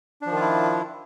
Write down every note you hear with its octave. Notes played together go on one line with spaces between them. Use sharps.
D#3 F3 D4 E4 F4